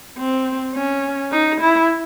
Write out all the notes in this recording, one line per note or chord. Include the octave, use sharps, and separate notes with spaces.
C4
C#4
D#4
E4